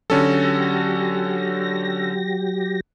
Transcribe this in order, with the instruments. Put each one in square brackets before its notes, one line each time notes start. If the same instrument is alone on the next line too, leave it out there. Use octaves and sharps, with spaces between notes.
[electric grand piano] D3 C#4 A4 [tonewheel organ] F#3 G4 A#6